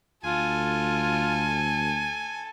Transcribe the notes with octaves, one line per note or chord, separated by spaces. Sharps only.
D2 F4 A4 G#5